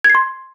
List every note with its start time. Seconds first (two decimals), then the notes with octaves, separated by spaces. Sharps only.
0.04 G#6
0.10 C7
0.15 C6